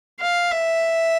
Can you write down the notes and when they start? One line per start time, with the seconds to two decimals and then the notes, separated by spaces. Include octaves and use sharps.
0.21 F5
0.51 E5